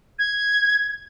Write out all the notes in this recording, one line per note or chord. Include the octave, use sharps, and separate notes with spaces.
G#6